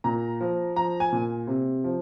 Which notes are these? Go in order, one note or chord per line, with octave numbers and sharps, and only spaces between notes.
A#2 A#5
F3
F3 A#5
G#5
A#2
C3
F3